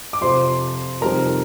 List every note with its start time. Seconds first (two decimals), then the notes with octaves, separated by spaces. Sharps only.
0.13 D6
0.21 F2 C3 F3 C5 C6
1.01 F2 C3 D#3 G3 C4 A#4 A#5